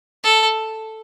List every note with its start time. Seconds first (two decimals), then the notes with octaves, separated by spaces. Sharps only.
0.24 A4